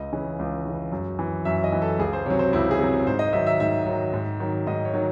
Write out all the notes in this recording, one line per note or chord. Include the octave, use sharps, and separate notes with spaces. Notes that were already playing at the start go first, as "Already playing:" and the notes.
Already playing: C#2 D#5
C#3 E3
C#2
C#3 E3
F#2
E3
F#2 E5
D#5
E3
A4
C#2 G#4
C5
C3 F#3 C#5
C5
C#2 E4
G#4
C3 F#3
G#2 C5
D#5
D#3 F#3 E5
E5
G#2 E5
D#3 F#3
G#2
D#3 F#3
G#2 D#5
C#5
D#3 F#3